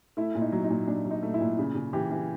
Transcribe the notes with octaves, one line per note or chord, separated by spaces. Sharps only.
A3 E4
A#2
D#4
F#3
D#4
A#2
A#2 D4
F#3
D#4
A3
E4
A#2
C#3
C#3
E3 G4
E3